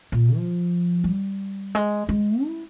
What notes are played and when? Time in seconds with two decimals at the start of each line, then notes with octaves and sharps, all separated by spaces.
0.12 A#2
0.36 F3
1.04 G3
1.75 G#3
2.09 G#3
2.44 E4